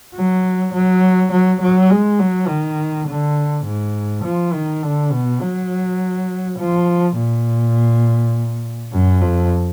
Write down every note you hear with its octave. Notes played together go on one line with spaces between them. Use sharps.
F#3
F#3
F#3
F#3
G#3
F#3
D#3
D3
G#2
F3
D#3
D3
B2
F#3
F3
A#2
F#2
F2